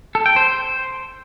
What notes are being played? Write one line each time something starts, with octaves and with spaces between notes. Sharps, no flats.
A4
G5
C5